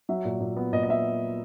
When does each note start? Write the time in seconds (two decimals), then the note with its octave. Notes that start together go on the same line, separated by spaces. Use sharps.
0.09 F#3 E5
0.25 A#2
0.41 A#2
0.57 B3
0.73 A#2 D#5
0.83 D#5
0.89 B3 E5